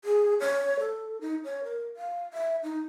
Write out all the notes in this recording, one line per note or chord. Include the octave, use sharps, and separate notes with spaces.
G#4
C#5
A4
D#4
C#5
A#4
F5
E5
D#4